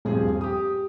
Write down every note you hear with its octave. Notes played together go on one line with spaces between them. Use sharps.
D#1 G2 F3 C4 G#4
G4 D#6